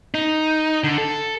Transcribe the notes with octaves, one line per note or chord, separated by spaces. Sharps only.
D#4
D3
A4